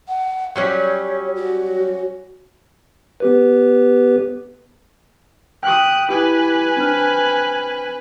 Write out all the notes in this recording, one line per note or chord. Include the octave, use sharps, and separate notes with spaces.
F#5
F#3 G3 C#4 C#5
F#4
B3 G4 B4
G5 D#6 F#6 B6
E4 G4 B4 G#5
C4 D4 F6